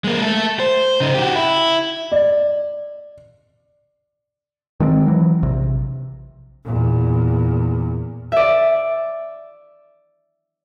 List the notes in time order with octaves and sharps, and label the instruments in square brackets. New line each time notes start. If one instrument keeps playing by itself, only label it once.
[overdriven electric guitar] G#3 A#3
A3 A4
C5
C#3 D#4
F#4 G4
E4
[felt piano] D5
[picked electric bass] D#3 G#3 A3 C4
E3 F#3
A#1 C3
[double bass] E2 A#2
[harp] D5 E5